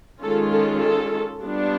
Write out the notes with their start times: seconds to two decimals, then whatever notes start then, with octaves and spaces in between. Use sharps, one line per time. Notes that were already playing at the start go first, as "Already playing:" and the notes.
0.22 D#3 G#3 C#4 F4 A4
0.51 A4
0.82 A4
1.41 G3 B3 D4 F4